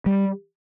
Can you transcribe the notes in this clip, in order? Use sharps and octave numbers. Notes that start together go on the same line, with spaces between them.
G3